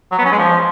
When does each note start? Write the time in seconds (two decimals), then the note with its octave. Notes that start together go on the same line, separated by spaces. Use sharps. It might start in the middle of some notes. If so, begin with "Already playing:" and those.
0.12 F#3
0.19 B3
0.25 C#4
0.32 G#3
0.38 F3